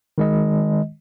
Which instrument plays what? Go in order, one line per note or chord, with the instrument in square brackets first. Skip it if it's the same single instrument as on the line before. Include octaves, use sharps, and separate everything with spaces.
[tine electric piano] D#3 G#3 D#5